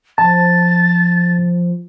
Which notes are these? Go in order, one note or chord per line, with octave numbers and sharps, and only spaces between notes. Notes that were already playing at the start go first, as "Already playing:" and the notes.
F3 A5 A6